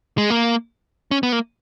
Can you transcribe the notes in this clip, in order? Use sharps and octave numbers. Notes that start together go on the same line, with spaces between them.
G#3
A#3
C#4
B3
A#3